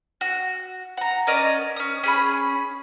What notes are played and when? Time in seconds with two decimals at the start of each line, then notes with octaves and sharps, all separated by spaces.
0.21 F#4
0.97 F#5 A#5
1.27 C#4 A#4 D5 D#5
1.76 C#4 D#6
2.04 C#4 G#4 B5